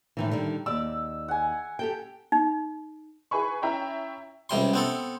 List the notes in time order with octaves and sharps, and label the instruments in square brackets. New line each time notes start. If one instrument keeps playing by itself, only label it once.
[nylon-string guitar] A2 D#3 E3
D3 D#3 G3
[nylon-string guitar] D#2 D5 [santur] E6
[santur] F#5 G#5
[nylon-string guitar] G4 A4 G5
[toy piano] D#4
[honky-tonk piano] E4 G#4 B4 G#5 B5 C#6
C#4 E4 C#5 E5 G5 A#5
[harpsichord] C#2 C3 G3 C6
B3 C4 A4